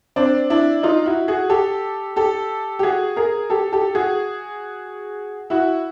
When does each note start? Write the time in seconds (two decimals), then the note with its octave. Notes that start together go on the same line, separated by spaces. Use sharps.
0.16 C4 D4
0.50 D4 E4
0.83 D#4 F4
1.06 E4 F#4
1.28 F#4 G#4
1.50 G4 A4
2.16 G4 A4
2.79 G4
2.83 F#4 G#4
3.16 G#4 A#4
3.50 G4 A4
3.72 G4 A4
3.95 F#4 G#4
5.50 E4 F#4